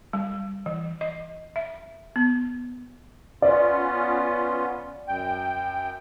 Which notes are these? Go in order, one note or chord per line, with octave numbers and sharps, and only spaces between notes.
G3
E3
D#5
E5
B3
B3 C#4 F4 D5
F#2 G5